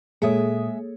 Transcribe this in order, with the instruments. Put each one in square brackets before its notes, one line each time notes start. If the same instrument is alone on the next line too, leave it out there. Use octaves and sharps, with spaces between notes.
[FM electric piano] A#2 D#6 [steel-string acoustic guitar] G#3 E5 [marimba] A#3 [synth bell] G#4 A4 C#5